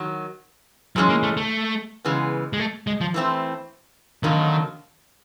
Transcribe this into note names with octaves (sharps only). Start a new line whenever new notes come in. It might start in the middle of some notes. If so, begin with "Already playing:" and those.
Already playing: D#3 F#3
G#2 E3 F#3 G#3 C#4
A#3
A3
A3
C#3 E3 G#3 B3
G#3
A3
G#3
F3
E3 A3 C4 E4
F2 D3 D#3 F#3 A#3 D#4